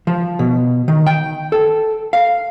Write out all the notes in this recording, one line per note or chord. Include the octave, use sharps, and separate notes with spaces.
F3
B2
D#3
G5
A4
F5